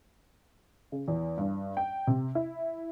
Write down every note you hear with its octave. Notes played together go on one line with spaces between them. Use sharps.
C#3
E2
G2
G5
C3
E4